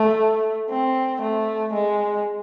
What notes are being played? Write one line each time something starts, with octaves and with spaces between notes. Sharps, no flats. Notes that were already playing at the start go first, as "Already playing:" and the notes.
Already playing: A3
C4
A3
G#3